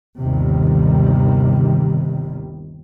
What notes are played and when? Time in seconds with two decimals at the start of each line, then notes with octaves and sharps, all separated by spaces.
0.20 G1 D#2 C3 D#3 G3